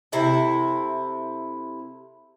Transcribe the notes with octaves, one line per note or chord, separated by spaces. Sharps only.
C3 E4 A4